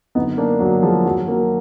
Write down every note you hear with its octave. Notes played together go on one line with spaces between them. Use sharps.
F#2 D3 B3 D#4
A#3 D4
F#2 D3 F#3
F3 G#3
F#2 D#3 F#3
F#3 A#3